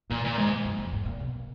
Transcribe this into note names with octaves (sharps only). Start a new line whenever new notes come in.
A#2 D#3
A#2
G#2
F#2
F2
G#2
A#2
B2